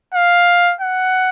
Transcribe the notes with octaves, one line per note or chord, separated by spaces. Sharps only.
F5
F#5